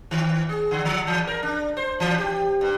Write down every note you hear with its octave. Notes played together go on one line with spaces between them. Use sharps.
D#3
G#4
D3
F3
E3
A#4
D4
C5
E3
G4
G2